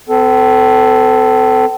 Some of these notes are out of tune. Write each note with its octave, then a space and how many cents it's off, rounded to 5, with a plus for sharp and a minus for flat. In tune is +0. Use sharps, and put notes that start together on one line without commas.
C4 -45 A4 +0